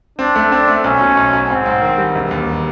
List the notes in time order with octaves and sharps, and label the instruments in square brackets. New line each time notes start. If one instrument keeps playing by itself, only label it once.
[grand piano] C4 [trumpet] D4
[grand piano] A3
C4
A3
[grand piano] B1 [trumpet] C#4
[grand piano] B2
B1
B1
[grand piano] G#2 [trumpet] C4
[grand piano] G#2
D#3
G3
E1
D#2